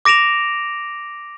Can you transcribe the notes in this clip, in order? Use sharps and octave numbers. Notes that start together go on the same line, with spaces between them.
D6 A#6 D7 E7 F7